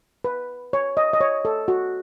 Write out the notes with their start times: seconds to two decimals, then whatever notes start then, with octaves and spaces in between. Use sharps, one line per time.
0.24 B4
0.73 C#5
0.97 D#5
1.13 D#5
1.20 C#5
1.45 A4
1.68 F#4